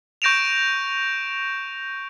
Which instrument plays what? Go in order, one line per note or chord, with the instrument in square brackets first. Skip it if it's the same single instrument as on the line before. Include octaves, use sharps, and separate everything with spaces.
[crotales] C#6 G6 A#6 D7 E7 F7